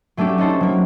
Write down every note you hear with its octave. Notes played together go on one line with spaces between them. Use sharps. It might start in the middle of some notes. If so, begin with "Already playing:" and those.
F#3 A3 C#4 D4 G4
C#4 D#4 A4 C5
F#3 A#3